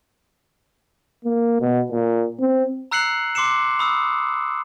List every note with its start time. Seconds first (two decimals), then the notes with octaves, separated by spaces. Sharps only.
1.25 A#3
1.61 B2
1.91 A#2
2.40 C4
2.91 A#5 E6 F#6 C7 C#7 F#7
3.35 C6 D6 C7 C#7 E7
3.79 B5 D#6 E6